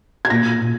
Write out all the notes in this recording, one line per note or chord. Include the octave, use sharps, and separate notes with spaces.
G#6
A#2 A#6
A#2